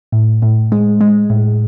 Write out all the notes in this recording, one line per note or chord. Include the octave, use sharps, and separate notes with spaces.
A2
A2
G#3
G#3
A2